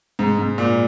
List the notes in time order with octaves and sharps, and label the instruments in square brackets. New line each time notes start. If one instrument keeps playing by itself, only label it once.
[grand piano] G#2
G#2
A#2